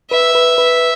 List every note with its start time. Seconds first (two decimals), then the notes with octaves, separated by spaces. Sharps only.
0.11 B4 E5
0.35 B4
0.58 B4